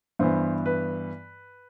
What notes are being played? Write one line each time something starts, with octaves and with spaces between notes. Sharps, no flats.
G2 E3 B3 C5
B4